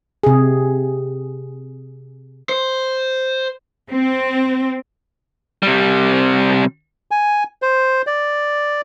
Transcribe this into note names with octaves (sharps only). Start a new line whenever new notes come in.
C3 G#4
C5
C4
C3 G3
G#5
C5
D5